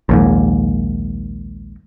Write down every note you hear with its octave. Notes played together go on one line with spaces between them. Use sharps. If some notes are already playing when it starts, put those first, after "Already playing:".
A#1 D#2 G#2